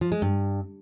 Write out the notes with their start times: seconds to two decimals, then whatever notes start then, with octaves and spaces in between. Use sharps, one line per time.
0.01 F3
0.12 G#3
0.22 G2